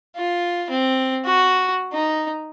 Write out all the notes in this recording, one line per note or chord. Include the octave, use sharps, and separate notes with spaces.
F4
C4
F#4
D#4